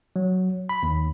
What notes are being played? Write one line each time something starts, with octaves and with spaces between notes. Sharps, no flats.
F#3
B5
D#2